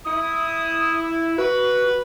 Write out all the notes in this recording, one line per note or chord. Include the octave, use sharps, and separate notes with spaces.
E4 D#6
F#4 B4